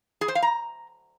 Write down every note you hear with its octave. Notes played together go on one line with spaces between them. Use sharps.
G#4
C5
F5
A#5